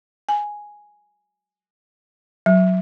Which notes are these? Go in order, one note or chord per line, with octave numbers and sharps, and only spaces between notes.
G#5
F#3